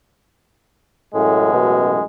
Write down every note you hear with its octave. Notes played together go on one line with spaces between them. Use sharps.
A1 F#2 A2 G#3
B2